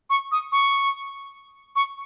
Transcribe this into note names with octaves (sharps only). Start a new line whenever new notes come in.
C#6
D#6
C#6
C#6